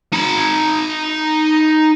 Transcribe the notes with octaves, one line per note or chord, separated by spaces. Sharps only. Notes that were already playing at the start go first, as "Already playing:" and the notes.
D#4 B5